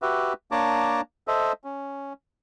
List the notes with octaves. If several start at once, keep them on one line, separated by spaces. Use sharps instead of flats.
F#4 G4 B4 E5
A#3 D4 C#5 A5 A#5 D6
A4 C5 D#5 E5
C#4